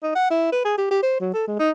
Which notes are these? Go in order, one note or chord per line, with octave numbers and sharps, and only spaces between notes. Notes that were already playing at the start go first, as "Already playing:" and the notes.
D#4
F#5
E4
B4
G#4
G4
G4
C5
F#3
A4
G#3
D#4